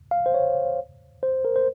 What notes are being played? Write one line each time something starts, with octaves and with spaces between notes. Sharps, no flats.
F5
C5
C#5
C5
A#4
C5